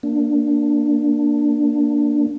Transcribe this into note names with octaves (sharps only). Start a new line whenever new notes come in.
A#3 D4